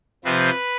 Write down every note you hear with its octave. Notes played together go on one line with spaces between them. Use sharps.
C3 F3 C4 B4